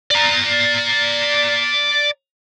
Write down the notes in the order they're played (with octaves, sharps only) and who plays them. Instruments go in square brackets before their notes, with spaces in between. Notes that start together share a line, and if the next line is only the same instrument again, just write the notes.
[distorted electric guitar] D5 A#5